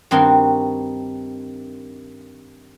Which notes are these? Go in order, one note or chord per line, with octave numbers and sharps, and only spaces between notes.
G2 D#3 C4 F#4 A#4 C6